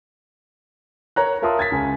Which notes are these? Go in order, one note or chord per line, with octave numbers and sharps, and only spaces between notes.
A#4 C#5 A#5 F#6
F4 A#4 E5 A5 C6 D#6
G#6 A6 B6
C#2 G#5